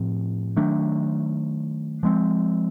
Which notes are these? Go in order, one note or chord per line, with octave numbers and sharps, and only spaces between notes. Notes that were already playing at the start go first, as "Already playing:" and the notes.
Already playing: A2 F3 C4
D#3 F#3 A3 D4
F3 G#3 C4